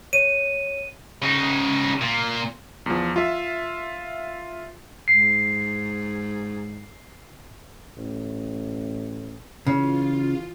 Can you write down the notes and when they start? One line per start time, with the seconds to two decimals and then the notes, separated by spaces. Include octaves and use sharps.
0.13 C#5 D#7
1.22 C#3 D#4
2.01 A#2
2.86 E2 F3
3.16 F4 E5
5.08 G#2 C7
7.97 A1
9.67 C#3 E3 F4